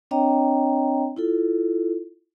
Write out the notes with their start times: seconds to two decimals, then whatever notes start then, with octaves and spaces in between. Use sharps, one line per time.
0.11 C4 D4 C#5 D#5 G5 A#5
1.16 E4 F4 A4